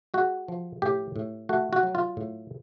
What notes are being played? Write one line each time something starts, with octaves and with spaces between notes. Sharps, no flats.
G#3 F#4
F3
A2 G4
A2
A3 F#4
F#4
F#3
F4
A2